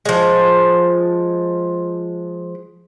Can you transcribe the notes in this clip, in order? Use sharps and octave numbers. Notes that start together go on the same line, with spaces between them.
F3 G#3